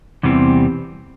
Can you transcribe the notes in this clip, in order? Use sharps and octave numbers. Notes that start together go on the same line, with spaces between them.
E2 C3 E3 G3 C4